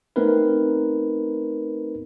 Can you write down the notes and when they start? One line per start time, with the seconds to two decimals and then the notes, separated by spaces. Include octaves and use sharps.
0.16 A3 B3 C4 D#4 A#4 B4